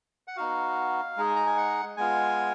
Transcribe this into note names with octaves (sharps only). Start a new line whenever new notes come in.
F#5
B3 D#4 F#4 F5
G#3 D#4 G#4
A#5
G#5
F#5
G#3 B3 F4 G#5